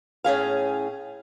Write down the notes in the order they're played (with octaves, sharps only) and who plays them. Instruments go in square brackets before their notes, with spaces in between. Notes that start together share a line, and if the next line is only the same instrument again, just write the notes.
[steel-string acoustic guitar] A2 C#4 G#4 F5